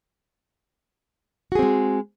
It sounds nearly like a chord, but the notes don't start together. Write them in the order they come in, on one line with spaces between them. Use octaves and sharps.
F#4 G#4 C4 G#3